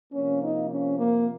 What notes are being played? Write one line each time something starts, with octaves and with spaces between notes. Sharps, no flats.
C3 F3 A#3 C#4
D#4
C#4
A#3